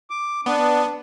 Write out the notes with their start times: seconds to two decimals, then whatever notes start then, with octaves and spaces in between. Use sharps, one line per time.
0.10 D6
0.46 B3 D4